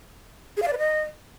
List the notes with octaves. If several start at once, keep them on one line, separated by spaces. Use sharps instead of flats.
G#4
F5
D5
B4
D#5